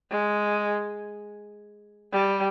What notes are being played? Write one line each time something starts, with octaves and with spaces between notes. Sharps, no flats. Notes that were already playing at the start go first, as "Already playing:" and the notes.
G#3
G3